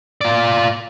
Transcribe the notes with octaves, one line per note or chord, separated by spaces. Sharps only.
F4 D5